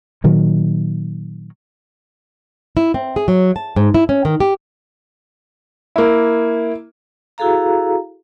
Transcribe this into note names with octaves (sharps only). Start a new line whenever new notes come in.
A#2 D#3 F#3
E4
C4
G#4
F#3
A5
G#2
E4
C#4
D#3
G4
A#3 E4
E4 F#4 G#4 A4 F5 A#5